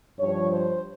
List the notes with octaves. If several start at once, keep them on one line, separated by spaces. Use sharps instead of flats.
G2 F3 C#5
C5